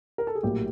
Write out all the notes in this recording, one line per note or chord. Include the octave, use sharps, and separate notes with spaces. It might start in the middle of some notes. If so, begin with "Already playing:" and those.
A#4
A4
G#4
A#1 A2 F#3 A#3 G4